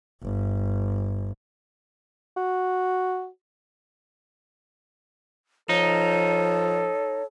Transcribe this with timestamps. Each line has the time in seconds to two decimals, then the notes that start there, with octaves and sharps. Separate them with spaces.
0.23 G1
2.37 F#4
5.69 F3 D#4 A4 C#5